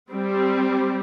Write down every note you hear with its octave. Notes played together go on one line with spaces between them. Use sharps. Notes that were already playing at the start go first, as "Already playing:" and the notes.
G3 C4